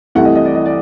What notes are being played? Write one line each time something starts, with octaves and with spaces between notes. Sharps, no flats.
C2 C3 E3 A3 F#5
D#5
D#5
D5
D#5
D5